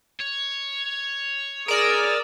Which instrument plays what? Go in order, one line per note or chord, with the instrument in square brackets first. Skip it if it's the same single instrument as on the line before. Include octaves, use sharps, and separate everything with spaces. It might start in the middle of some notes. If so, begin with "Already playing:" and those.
[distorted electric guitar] C#5
[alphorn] G#4 [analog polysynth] A#4 D5 [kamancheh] D#6 E6